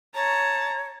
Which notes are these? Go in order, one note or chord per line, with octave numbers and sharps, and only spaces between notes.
C#5 A5 A#5